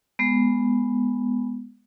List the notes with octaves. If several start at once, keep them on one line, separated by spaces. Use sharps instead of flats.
G#3 B3